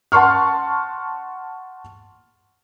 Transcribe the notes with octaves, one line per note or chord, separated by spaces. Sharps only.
F#5 A5 C6 C#6 F6